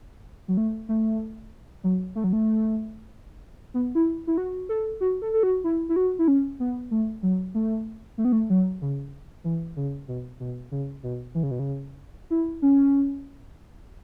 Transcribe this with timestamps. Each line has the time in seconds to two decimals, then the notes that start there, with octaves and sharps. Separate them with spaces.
0.48 F#3
0.57 A3
0.89 A3
1.84 F#3
2.15 A3
2.24 F#3
2.33 A3
3.74 B3
3.95 E4
4.27 E4
4.38 F#4
4.69 A4
5.01 F#4
5.22 A4
5.33 A4
5.43 F#4
5.64 E4
5.89 E4
5.96 F#4
6.19 E4
6.28 C#4
6.60 B3
6.91 A3
7.23 F#3
7.55 A3
8.18 A3
8.25 B3
8.32 A3
8.50 F#3
8.82 C#3
9.44 E3
9.76 C#3
10.08 B2
10.40 B2
10.71 C#3
11.03 B2
11.35 E3
11.43 C#3
11.51 B2
11.59 C#3
12.30 E4
12.62 C#4